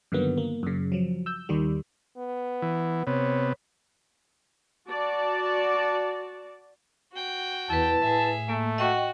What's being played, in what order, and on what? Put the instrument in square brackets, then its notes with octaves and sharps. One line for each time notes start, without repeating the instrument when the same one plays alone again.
[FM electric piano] G2 D3 D#3 F#3 A#3 B3
A#3
F#2 C#3
F3 F#3
E6 G6
D#2 D#3 G3
[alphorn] B3
[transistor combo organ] E3
[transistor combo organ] C3 B3 [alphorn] C#5
[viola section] F#4 D5 A5
[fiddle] F#4 G5
[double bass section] E2 [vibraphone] E4 B4 [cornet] A5
[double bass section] A2 [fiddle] G#4 E5
[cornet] A3 [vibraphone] A#3
[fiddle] F#4 [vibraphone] D#5 G5 C#6